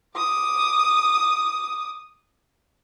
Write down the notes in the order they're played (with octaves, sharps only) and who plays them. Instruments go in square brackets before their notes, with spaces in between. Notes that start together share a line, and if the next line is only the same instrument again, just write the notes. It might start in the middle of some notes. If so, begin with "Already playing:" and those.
[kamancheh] D6 D#6